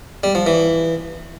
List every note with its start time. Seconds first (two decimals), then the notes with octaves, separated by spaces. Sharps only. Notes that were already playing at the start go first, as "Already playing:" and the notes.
0.24 G3
0.35 F3
0.46 E3